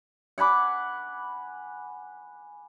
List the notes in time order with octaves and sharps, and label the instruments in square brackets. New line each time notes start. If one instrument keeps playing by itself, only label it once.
[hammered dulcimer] F#5 G#5 B5 D6